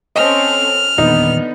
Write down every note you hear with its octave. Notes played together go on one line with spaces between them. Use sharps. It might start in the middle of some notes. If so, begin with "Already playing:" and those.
C4 C#4 A4 D#5 F6
D#1 E2 D3 B3 D#4